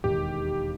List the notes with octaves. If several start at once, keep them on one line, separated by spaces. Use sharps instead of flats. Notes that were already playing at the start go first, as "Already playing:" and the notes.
E1 D#2 D#3 G4